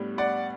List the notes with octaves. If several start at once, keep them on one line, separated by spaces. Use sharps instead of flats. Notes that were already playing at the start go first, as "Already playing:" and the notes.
Already playing: A2 G3 B3 D4
D5 F#5